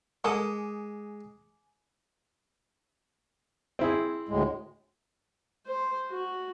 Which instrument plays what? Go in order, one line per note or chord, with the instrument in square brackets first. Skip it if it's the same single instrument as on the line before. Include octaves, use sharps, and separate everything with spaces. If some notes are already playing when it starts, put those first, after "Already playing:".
[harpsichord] G#3 D#6 [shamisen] A#3 A4 D#5 [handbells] G#5 D6
[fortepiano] C4 E4 G#4
[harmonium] D2 A2 G#3
[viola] C5
F#4